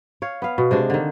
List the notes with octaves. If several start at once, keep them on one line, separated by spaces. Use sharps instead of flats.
C#5 F5
B3 F5
B2
C3 G#3 D4
D3 D#3